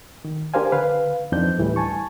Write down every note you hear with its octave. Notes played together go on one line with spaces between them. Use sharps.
D#3
D4 G4 A#4 C5 F5 G#5
D3 B4 F5
F2 E3 C4 D4 D#4 G6
D2 A2 E3 G3
G#5 A5 C#6